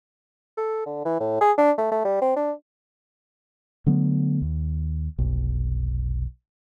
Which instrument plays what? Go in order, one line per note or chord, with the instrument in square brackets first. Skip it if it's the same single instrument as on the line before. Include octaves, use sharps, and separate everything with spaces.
[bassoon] A4
D3
E3
A2
G#4
D4
A3
A3
G3
C4
D4
[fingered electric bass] D3 F#3 A3 B3
D#2
F1 B1